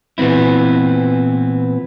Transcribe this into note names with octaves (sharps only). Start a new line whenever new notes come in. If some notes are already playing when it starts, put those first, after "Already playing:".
A#2 E3 B3 C4 E4